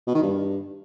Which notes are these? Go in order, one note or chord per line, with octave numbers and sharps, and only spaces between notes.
B2
D#3
G2